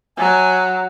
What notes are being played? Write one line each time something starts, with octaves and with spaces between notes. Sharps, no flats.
F#3 G#5